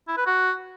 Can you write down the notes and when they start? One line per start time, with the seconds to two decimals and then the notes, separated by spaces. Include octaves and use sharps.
0.08 E4
0.17 B4
0.26 F#4